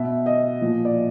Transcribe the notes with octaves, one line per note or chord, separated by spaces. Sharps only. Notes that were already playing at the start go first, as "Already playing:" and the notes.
Already playing: B2 E5
D#5
A#2 F3
D5